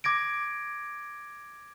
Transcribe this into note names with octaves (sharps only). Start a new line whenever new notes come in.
D6 G#6 A#6 D7